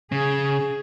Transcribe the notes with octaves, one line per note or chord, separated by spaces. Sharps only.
C#3 G#4